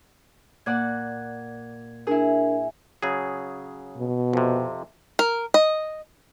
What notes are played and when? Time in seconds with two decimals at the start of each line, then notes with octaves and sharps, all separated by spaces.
0.66 A#2 D5 F#5 G#6
2.07 D4 E4 G#4 A#4
3.03 C#3 F#3 G#4
3.97 B2
4.33 F2 C3
5.19 A#4
5.54 D#5